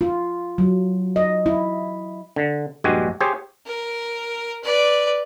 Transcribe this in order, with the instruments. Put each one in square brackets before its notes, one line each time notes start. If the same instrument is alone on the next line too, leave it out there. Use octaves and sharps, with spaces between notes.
[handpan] F4
F#3
D#5
E4
[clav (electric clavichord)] D3
A#1 G2 G#3 F#4 G4 G#5
G4 G#4 C5 C#5
[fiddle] A#4
B4 D5